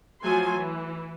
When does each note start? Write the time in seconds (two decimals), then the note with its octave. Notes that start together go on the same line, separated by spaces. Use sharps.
0.21 F3 F#3 A3 G#5 C6
0.57 E3